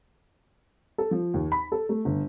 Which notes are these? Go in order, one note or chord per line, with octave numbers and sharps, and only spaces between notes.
A4
F3
D#2
B5
A4
A3
G1